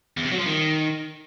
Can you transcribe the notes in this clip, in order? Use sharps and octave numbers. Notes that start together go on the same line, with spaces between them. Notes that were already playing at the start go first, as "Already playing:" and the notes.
E2
C3
F#3
F3
D#3